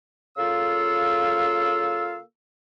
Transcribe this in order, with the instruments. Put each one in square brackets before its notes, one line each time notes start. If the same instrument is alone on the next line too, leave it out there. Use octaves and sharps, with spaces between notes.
[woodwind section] C#3 A#3 F4 A4 F5 E6